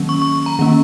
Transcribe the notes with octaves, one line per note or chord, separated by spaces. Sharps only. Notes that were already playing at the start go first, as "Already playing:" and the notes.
Already playing: D#3 F#3 A#3 C#4
C#6
C#6
A#5
D#3 A#3 C#4